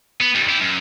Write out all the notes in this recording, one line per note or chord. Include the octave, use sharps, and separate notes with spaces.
B3
D#2 G3
E4 G4
F#2